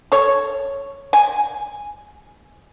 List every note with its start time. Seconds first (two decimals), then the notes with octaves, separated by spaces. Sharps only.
0.12 A4 C#5
1.13 G#5